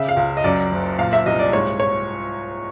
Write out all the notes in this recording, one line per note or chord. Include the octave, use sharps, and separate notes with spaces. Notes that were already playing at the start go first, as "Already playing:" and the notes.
Already playing: C#3 E5
F5
C#2
D#5
F#2 D5
F#1
A#2 F5
E5
C2 D#5
D5
G#2 C#5
C#5